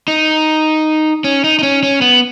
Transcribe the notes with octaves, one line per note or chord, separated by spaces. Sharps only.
D#4
C#4
D#4
D#4
C#4
C#4
B3